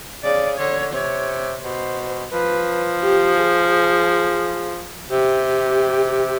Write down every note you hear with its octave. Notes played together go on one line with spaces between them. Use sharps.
C#3 D5
D3 C#5
C3 C#5
B2 C5
F3 B4
G4
G#4
C3 G4